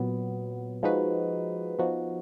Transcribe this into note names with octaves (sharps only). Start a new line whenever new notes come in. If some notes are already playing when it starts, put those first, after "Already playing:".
Already playing: A#2 F#3 B3
F3 G#3 D#4 F#4 B4
F3 B3 D#4 F#4